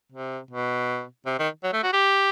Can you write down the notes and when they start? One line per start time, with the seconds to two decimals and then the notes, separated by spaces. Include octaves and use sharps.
0.12 C3
0.51 B2
1.26 C3
1.39 D#3
1.63 F#3
1.73 A3
1.83 F#4
1.93 G4